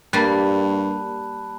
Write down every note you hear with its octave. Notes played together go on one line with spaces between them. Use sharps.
G2 G3 A#3 A5 B5 F#6